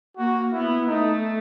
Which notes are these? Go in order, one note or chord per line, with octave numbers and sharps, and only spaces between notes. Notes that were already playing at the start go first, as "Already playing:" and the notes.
A#3 F#4
B3 E4
A3 D#4